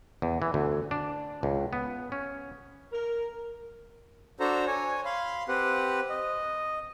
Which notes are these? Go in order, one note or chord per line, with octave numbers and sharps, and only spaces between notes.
E2
E3
D2
D4
C#2
B3
C#4
A#4
D4 F#4 A4 C5 A#5
C#5 G#5
F5 B5 C6
C4 G4 B4 F#5
D#5